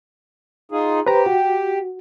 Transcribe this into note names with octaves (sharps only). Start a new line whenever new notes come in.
D#4 F4 G#4
G4 B4 C5 A#5
F#4